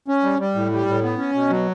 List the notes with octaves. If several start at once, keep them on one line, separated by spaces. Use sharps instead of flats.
C#4
G3
G3
A2
G3
A2
B3
C#4
B2
F#3